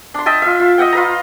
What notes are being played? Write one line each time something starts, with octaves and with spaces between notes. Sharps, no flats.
D4 C6
D#5 E5 G5 A5
F4 E5
F4
D#5 E5 F#5 G5
F4 B4 A#5